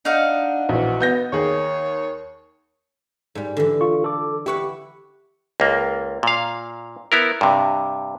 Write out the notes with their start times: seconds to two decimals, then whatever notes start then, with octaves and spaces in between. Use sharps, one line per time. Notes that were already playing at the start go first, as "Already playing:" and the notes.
0.05 D4 D#4 F5 F#5
0.69 A#1 E3 F#4
1.00 B3 G6 A#6
1.33 D#2 G#4 C#5
3.35 G#2 G3
3.57 D3 E3
3.81 F4 C#6
4.04 A4 D6
4.46 E4 G4 B4 F#5 C#6
5.60 C#2 A#3
6.23 A#2 F5
7.12 B3 E4 A#4
7.41 G2 C3